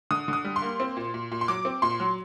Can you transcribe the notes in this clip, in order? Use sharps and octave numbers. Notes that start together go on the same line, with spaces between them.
D3 D#6
D3 D#6
G3
C6
A#3
C4
A#2
A#2
A#2
C6
F#3 D6
C4
A#2 C6
F#3